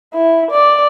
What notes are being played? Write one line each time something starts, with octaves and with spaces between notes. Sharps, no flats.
E4
D5